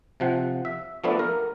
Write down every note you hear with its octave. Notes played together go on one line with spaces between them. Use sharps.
C3 F3 F#5
E5
F3 A3 B3 D4 A4 D5
A#4